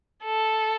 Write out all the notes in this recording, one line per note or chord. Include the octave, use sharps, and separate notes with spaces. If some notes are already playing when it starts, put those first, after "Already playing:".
A4